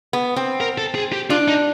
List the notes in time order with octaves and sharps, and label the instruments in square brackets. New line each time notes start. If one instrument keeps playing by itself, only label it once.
[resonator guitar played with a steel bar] B3
C4
[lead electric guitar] A#4
A4
G#4
G4
[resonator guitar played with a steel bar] D4 [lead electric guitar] F4
[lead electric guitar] D#4